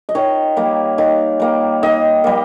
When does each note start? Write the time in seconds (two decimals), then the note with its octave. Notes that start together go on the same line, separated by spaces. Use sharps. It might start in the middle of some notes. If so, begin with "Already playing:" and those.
0.09 D#5
0.15 D#3 C#5
0.56 G3 A#3
0.98 D#3
1.40 G3 A#3
1.83 D#3 D#5
2.24 G3 A#3